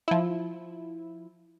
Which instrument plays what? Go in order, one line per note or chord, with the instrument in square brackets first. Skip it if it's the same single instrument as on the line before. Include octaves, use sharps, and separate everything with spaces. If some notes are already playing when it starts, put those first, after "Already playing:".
[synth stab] F3 E4